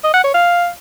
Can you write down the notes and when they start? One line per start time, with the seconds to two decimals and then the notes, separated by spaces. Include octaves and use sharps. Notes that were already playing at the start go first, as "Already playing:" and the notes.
0.03 D#5
0.14 F#5
0.24 C#5
0.34 F5